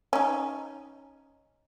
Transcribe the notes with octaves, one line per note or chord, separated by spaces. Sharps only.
C#4 D#4